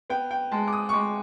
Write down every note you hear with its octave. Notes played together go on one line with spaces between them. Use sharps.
B3 G5
G5
G#3 A5
D6
D#6
C#6
G#3 D6